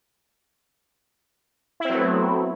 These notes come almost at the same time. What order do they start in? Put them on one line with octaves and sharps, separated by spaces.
E4 C4 F#3 A3 B3